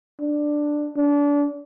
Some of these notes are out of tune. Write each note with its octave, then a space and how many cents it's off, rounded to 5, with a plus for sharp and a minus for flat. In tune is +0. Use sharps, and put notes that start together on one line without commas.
D4 +10
D4 -30